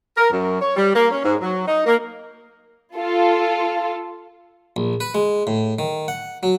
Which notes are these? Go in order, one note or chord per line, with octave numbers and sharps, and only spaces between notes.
A#4
F#2
C#5
G3
A#3
C#4
G#2
F#3
D#4
A#3
F4 A4
A#1
B4
G#3
A2
D#3
F#5
F#3